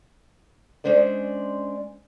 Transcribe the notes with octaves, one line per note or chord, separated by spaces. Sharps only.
G#3 C#4 D4 C5 D5